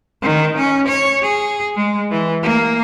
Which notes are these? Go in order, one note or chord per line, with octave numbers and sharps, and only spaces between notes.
D#3
C#4
C#5
G#4
G#3
E3
A#3